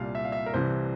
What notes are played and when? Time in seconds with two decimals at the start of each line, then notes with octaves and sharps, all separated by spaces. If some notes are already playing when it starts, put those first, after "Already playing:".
Already playing: C2 A#2 G3 F5
0.15 E5
0.24 F5
0.32 E5
0.46 A#4
0.54 C2 C3 E3 G3 C5